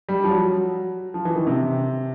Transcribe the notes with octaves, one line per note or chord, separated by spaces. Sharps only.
G3
F3
F#3
F3
E3
D#3
C3